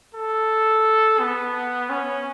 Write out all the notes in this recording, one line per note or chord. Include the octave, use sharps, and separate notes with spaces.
A4
B3
C#4